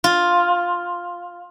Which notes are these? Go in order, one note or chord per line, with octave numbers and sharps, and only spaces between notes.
F4